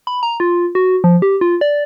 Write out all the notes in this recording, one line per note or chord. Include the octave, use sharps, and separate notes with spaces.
B5
A#5
F4
F#4
F3
G4
F4
D5